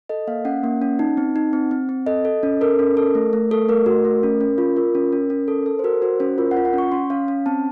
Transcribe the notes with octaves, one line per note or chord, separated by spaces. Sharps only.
A4 D#5
A#3 F5
C#4 F#5
A#3
C#4
D#4
C4
D#4
C4
C4
C4
A4 D#5
A4
C#4
A4 A#4
C#4
A4
A3
A3
A4
A3 A#4
F#4
A3
C#4
C#4
F4
F4 A#4
C#4
C#4
C#4
A4
A4
C5
F#4 A#4
F#4 C5
C#4 C5
F4 A#4
F#5
F4
F#5
C#4 C#6
C#4 C6
C#4 F5
C#4
C4 A5